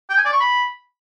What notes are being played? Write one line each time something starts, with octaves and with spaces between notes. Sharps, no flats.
G5
G#5
D5
C#6
B5